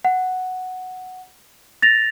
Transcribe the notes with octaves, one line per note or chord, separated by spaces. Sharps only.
F#5
A6 A#6 F7